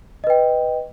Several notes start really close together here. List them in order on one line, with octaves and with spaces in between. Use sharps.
D#5 B4 G5